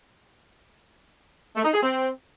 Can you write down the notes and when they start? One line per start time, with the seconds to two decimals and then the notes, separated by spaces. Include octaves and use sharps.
1.56 A3
1.65 D#4
1.73 G#4
1.82 C4